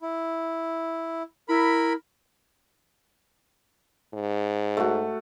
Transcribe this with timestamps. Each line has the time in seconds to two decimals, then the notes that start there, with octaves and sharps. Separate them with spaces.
0.02 E4
1.49 E4 A#4 B5
4.14 G#2
4.77 A3 F#4